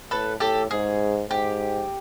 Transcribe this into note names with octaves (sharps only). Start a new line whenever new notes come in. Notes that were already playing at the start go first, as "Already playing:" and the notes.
A2 A4 B4
A2 G4 A4
G#2 G#4
G#2 G4